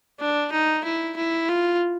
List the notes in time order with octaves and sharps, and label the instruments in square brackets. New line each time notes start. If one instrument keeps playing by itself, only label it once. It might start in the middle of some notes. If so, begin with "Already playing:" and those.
[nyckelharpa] D4
D#4
E4
E4
F4